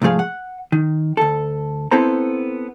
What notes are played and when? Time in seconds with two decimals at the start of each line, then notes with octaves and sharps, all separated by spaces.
0.02 C2 G#2 F3 A3 G#4 F5
0.19 F#5
0.72 D#3
1.17 D2 A4
1.91 B3 C4 E4 A4 C5 A#5